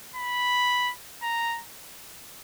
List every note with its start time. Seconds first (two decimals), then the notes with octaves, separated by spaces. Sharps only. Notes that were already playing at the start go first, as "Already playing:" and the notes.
0.16 B5
1.23 A#5